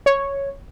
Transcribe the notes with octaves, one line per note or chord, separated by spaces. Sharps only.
C#5